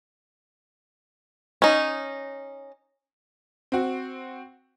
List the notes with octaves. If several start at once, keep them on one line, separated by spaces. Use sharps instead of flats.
C#4 D#4
C4 F#4